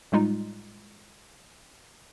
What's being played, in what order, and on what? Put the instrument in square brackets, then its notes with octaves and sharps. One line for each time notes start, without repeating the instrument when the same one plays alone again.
[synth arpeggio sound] A2 G3 G#3 D#4 F4